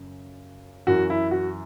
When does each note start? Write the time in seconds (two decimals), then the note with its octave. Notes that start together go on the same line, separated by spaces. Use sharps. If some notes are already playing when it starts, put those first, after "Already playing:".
Already playing: F#2 C#3
0.87 F#2 E3 F#4
1.10 E4
1.31 F#4